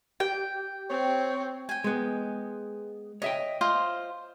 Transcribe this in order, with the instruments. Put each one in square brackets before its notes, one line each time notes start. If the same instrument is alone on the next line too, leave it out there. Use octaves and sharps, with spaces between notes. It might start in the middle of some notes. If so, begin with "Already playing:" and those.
[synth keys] G4 [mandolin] G5
[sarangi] C4 [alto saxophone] C#5
[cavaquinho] G5 G#5
[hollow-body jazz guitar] G#3 B3
[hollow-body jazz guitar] C#5 E5 G5 [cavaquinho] D#5
[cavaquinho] F4 C5 D#5